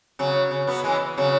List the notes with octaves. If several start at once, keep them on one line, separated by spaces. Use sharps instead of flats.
C#3 F#3
C#3
F#3 B3
E3 G#3
C#3 F#3